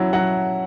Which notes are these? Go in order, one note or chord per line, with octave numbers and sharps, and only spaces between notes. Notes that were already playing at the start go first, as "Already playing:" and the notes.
Already playing: F#3 C#4 E4
F#3 F#5